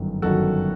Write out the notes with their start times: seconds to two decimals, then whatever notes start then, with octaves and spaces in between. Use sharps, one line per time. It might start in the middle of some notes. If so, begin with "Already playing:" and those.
Already playing: G1 F#2 D#3 F#3
0.22 G1 F#2 D#3 F#3 F#4 A4